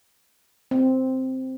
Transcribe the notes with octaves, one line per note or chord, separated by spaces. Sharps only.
C4